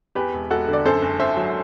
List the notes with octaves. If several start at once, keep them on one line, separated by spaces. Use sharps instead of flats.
E2 G4 B4
E1
E1 F#4 A4
D3
D5
F#2 A4 C5
F#1
F#1 C5 E5
F#3